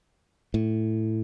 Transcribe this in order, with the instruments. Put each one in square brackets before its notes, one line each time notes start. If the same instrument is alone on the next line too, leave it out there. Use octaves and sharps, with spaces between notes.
[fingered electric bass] A2